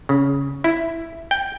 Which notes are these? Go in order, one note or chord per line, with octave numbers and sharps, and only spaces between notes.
C#3
E4
G5